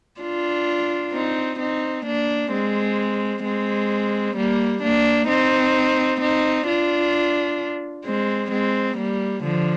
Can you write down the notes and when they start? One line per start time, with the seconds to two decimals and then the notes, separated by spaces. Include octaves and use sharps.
0.21 D4 F4
1.13 C4 D#4
1.60 C4 D#4
2.06 A#3 D4
2.52 G#3 C4
3.44 G#3 C4
4.36 G3 A#3
4.83 A#3 D4
5.29 C4 D#4
6.21 C4 D#4
6.67 D4 F4
8.05 G#3 C4
8.51 G#3 C4
8.97 G3 A#3
9.44 D3 F3